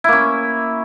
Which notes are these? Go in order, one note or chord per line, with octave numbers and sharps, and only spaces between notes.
A#3 C#4 E4